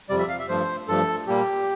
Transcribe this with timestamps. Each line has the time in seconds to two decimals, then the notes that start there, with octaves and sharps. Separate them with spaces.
0.09 F2 C3 G3 D5
0.19 E5
0.29 F5
0.39 E5
0.49 G2 F3 A3 C5
0.88 G2 F3 A3 A4
1.27 A#2 G3 A#3 G4